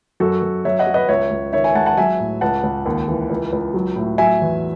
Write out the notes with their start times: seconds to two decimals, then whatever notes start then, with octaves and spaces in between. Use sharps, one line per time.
0.20 F#2 F#4 A4
0.42 F#2
0.65 F#3 C#5 E5
0.79 D#5 F#5
0.87 F#3
0.94 B4 D#5
1.08 C#2 C#5 E5
1.31 C#2
1.53 D#3 C#5 E5
1.64 E5 G#5
1.75 G#3 F#5 A5
1.86 F#5 A5
1.97 F#3 E5 G#5
2.20 A2
2.41 C#2 F#5 A5
2.64 C#2
2.86 D#2
3.08 E3
3.30 C#2
3.53 C#2
3.74 F#3
3.96 A2
4.18 F#3 E5 G#5
4.41 E2